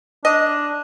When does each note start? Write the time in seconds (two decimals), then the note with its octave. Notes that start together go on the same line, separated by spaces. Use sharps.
0.25 D4 D#5